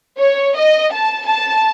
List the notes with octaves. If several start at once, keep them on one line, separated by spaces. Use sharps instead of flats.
C#5
D#5
A5
A5